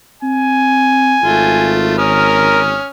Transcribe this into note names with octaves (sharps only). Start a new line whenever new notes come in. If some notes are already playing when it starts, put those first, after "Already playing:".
C4 G#5
G#1 A3 F4
C#4 A#4 D#6 F6